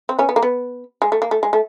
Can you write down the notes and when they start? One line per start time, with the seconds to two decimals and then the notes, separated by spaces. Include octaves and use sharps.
0.09 C4
0.19 B3 C#4
0.29 B3
0.36 A#3
0.43 B3
1.02 G#3
1.12 A3
1.22 A#3
1.31 A3
1.43 G#3
1.53 A3